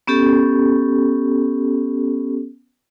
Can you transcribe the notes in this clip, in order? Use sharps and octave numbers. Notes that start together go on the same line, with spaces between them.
B3 C#4 G4 A4